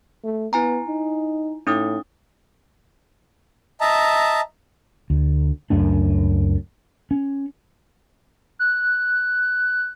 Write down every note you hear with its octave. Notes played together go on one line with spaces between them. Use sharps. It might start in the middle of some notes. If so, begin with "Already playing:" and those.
A3
B3 E4 G#5 A#5
D#4
A2 C#4 D#4 D#6
D#5 E5 A5 A#5
D2
C#2 F#2 A3 D4
C#4
F#6